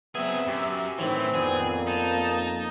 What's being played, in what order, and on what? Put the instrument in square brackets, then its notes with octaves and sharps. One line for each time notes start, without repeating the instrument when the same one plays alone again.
[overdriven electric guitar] F#3 G#4 [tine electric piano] B3 C4 [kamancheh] E5
[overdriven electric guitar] F#2 [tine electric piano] G4
[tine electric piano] A2 D#3 C#5 [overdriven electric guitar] E3 [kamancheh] C4
[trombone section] F2 A#3 [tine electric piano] B3 B4 D5 [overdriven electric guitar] G#4
[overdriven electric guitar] D#4 [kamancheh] A5